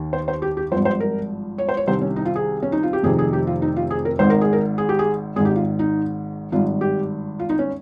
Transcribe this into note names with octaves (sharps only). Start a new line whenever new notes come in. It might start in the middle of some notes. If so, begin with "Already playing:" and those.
Already playing: D#2 D#3
C5
C5
G4
G4
G#1 G2 F3 C5
C5
A#4
C#5
C5
C#5
C2 C3 D#3 C5
C#4
D#4
F4
G#4
C#4
D#4
F4
G4
F1 F2 C3 D#3 G#4
G#4
G4
F4
D#4
F4
G#4
A#4
G#1 G#2 D#3 C5
A#4
G#4
A#4
G#4
G4
G#4
G#1 G#2 D#3 G#4
G4
F4
D#4
G#1 G2 D#3 F4
G4
F4
D#4
C#4